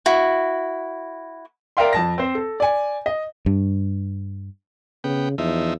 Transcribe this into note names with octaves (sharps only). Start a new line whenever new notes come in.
E4 F#4
A#4 D5 E5 F5 G5 C6
F2 A5 A#6
C4 C5
A4
D5 G#5
D#5
G2
C#3 B3 G5
E2 F3 D#4 E5